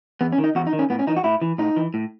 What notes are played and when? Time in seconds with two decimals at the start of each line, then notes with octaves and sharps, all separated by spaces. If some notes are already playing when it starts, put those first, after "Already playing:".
0.21 E2 B3
0.33 C#4
0.38 D#3
0.44 D#4
0.55 E2 F#4
0.67 D#4
0.73 D#3
0.79 C#4
0.90 A2 B3
0.99 C#4
1.07 E3 D#4
1.16 F#4
1.24 A2 E4
1.42 E3
1.58 A2 D#4
1.76 E3
1.94 A2